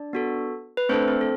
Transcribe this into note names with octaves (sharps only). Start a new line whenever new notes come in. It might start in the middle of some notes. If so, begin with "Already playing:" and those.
Already playing: D4 D5
B3 F#4 A4
B4
A3 C4 D4 A4 C5
C4 C5
A4